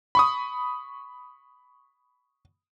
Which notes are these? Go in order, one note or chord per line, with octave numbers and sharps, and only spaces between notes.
B5 C#6 D#6